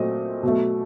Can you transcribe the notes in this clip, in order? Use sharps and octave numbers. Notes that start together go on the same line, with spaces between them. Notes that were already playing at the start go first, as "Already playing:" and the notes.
Already playing: A#2 F#3 A3 C4 D#5
B2 F#3 A3